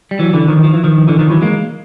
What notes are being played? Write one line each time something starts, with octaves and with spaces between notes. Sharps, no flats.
G3
E3 F#3
D3 E3
D#3 F3
F3
E3
D#3 F3
D3 E3
D#3 F3
E3 F#3
G#3 A#3